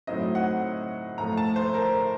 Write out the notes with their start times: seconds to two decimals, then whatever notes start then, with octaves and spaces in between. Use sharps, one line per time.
0.07 A2 F#3 C4 D#4 D#5
0.35 F#5
1.18 A2 F3 A3 A#5
1.37 A5
1.56 C5
1.74 A#4